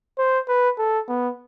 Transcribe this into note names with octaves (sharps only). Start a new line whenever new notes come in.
C5
B4
A4
B3